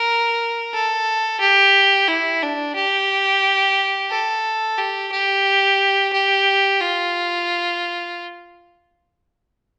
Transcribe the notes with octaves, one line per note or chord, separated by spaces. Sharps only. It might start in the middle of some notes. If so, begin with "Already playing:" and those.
Already playing: A#4
A4
G4
E4
D4
G4
A4
G4
G4
G4
F4